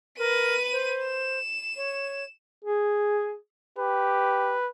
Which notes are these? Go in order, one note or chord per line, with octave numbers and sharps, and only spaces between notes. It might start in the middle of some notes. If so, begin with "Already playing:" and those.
A#4 B4 D#7
C5
E7
C#5
G#4
G4 B4